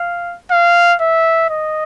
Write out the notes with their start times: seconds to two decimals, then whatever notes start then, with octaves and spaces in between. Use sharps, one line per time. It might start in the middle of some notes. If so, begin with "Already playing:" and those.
Already playing: F5
0.51 F5
1.01 E5
1.50 D#5